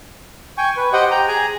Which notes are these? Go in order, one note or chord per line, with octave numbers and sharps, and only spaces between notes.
G5 G#5 C#6
B4
G4 C5 D#5 F#5 G5
G5 A#5
G#4 G#5 A#5